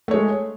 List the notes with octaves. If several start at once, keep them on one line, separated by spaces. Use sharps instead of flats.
G#3 A3 C#5